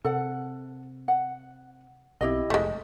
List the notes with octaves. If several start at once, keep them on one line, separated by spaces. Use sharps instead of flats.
C3 A4 F#5
F#5
B1 C4 E4 G4 D#5
F1 G#3 A3